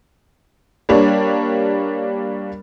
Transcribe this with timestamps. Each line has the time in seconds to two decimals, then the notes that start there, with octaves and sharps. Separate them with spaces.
0.89 G3 A#3 D4 C#5